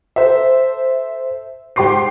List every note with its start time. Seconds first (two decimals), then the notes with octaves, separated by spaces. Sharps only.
0.16 A4 C5 E5
1.76 G#2 G4 C6 D6 C7